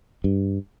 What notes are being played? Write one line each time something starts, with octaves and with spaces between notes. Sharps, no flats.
G2